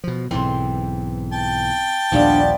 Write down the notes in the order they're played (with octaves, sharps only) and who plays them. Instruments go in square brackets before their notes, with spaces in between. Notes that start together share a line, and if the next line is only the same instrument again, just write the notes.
[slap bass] B2 F3
[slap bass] B1 G#2 E3 [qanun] C4 C5 C6
[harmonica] G5 A5
[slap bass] A#1 D#2 A#2 [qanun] F3 G3 B3 [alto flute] D4